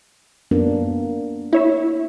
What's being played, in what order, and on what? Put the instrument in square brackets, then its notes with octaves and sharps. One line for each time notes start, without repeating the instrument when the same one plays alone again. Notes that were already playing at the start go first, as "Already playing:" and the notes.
[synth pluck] F#2 [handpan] A#3 B3 D4
[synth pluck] E4 C#5 E5